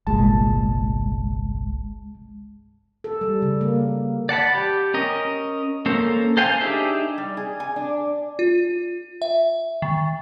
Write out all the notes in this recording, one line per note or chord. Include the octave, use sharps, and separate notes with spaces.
G1 C2 A#2 G#3 A5
A4
G3
C#3
A#3
D5 F#5 A5 B5
G4
C#4 A#4 D#5
A#3 C#4 A4 A#4 C5
A4 C5 F5 G5 G#5
D4 D#4 G4 G#4 E5
G3
G#4
G#5
D4
F4
E5
D#3